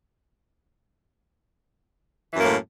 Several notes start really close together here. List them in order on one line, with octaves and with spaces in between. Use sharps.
E3 F#2 A#3 A2